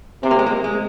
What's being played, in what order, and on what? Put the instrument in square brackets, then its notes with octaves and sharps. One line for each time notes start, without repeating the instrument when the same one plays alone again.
[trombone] C3 [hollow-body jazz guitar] C4
[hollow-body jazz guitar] A#3
G#3
A#3
G#3